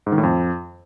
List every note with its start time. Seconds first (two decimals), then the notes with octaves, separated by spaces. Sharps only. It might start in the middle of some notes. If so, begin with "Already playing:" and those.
0.06 G#2
0.12 D#3
0.18 A2
0.23 F2